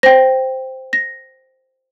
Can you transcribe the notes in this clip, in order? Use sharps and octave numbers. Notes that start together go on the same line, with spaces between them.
C5 G5 A#6
A#6